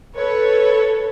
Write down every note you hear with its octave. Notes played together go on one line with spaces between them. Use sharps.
A4 B4 C#5